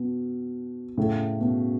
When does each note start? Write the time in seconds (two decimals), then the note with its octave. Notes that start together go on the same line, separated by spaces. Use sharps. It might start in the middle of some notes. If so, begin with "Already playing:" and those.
Already playing: B2
0.98 A2 C#3
1.41 B2